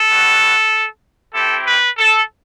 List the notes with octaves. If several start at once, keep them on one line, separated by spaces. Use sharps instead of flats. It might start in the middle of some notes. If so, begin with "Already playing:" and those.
Already playing: A4
G3 B3 F#4
C4 E4 G4 A4
B4
A4